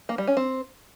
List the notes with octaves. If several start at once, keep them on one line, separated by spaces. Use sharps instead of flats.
A#3
G3
C#4
C4